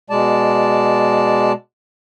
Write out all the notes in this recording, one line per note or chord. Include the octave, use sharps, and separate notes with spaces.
B2 G#3 D5 A5